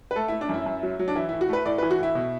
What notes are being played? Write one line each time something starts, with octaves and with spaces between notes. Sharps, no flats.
B4
A3 A4
E4
A3
D4
F#2 E4
F#2
F#3
F#3
D4
E3 E4
A2 E4
F#4
A3 B4
A2 D5
B4
E3
F#4
A2 E4
B2